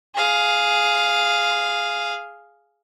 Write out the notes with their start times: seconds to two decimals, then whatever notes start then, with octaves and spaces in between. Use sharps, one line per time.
0.15 G#4 F5